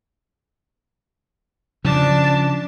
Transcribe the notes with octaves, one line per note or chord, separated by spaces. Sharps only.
C#3 F3 D4 A5